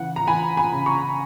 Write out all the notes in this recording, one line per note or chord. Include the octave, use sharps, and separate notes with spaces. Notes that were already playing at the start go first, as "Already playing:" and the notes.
Already playing: C#3 E3 F#5
A#5
E3 G#5 B5
G#5 B5
C#3
A#5 C#6